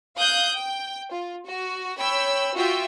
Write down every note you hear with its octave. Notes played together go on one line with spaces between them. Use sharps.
F5 D#6 F#6 G6
G5
F4
F#4
C#5 G5 B5 E6
F4 F#4 E5 G5 E6